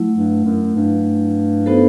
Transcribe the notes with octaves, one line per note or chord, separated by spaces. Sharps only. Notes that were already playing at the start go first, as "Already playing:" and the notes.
Already playing: F#3 A3 E4
G2
F#2
G2
B3 D#4 F#4 A4 C5